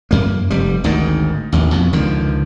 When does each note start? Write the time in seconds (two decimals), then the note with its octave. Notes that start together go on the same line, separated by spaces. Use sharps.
0.11 F#2 A#3
0.50 F1 G3
0.84 G#1 D2 G#2 D#3
1.52 A1 D#2
1.72 F2 B2
1.93 C#2 D3 D#3 F3